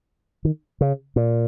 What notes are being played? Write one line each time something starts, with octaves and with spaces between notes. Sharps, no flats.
D#3
C#3
A#2